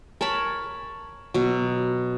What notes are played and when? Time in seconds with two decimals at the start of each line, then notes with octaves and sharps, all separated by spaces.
0.21 A#4 C#5 A5 B5
1.34 B2 F#3